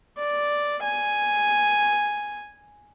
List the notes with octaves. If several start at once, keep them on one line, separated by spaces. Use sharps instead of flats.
D5
G#5